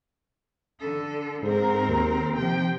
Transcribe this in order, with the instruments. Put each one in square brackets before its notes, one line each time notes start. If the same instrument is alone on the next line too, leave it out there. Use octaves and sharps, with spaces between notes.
[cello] D3 A4
[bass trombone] G#2 [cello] C4 A#4
[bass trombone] D#2
[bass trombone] C3 [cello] F3 G5